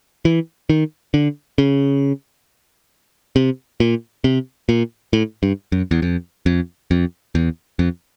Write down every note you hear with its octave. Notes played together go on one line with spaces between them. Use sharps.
E3
D#3
D3
C#3
C3
A#2
C3
A#2
A2
G2
F#2
E2
F2
F2
F2
E2
F2